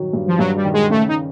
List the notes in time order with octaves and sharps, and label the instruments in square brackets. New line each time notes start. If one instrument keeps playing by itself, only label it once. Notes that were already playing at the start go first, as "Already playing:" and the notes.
Already playing: [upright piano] G2 D#3 F#3
G2
[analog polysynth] F3
[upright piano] G2 [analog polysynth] F#3
[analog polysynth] G3
[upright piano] D#3
[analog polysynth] G#3
[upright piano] C#3 [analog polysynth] A3
[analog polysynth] D#4